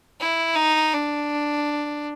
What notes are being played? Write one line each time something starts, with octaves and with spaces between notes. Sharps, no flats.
E4
D#4
D4